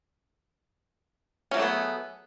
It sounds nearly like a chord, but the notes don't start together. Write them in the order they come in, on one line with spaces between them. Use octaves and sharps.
C#4 F#3 A3 G#4 B3